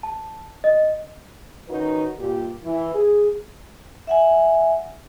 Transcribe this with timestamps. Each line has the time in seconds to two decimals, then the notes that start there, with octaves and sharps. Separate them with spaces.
0.03 A5
0.64 D#5
1.68 D#3 C#4 D#4 F#4 A#4 B4
2.18 G2 A#2 G4
2.64 E3
2.95 G#4
4.07 E5 F#5 G#5